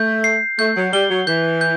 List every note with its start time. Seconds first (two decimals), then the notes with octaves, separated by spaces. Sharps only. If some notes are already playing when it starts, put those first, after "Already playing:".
Already playing: A3 G6
0.24 C7
0.59 A3 G6
0.76 F#3
0.93 G3 G7
1.10 F#3
1.27 E3 G6
1.61 G6